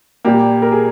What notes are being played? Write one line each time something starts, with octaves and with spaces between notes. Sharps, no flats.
A#2 G3 A#3 G4
A#4
G#4